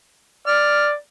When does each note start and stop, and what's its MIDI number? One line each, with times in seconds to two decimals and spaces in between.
0.47 0.97 74
0.47 0.87 89